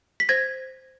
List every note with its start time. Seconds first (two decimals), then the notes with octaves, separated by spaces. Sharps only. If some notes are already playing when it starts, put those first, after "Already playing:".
0.20 B6
0.29 C5 G#6 A#6